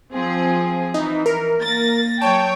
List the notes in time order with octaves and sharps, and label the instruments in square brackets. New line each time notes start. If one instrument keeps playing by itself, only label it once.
[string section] F3 C4 G#4
[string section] E3 [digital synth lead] D#4
[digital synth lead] A#4
[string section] A#3 A6 A#6
[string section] F#3 C#5 G5 [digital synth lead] A5